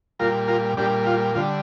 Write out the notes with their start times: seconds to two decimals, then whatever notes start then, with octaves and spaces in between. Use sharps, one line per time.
0.19 A#2 G3 F4 A#4
0.48 F4 A#4
0.77 A#2 G3 D4 G4
1.06 F4
1.35 D3 G3 F4